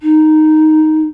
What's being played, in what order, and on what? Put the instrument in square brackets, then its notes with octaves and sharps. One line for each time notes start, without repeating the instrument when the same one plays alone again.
[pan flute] D#4